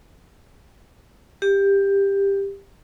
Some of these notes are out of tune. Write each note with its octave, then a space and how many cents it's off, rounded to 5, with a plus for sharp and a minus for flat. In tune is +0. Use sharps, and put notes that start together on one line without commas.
G4 +15